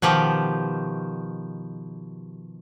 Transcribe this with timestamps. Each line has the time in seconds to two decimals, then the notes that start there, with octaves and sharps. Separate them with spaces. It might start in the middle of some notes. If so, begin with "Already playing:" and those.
0.02 B2 D#3 F3 G4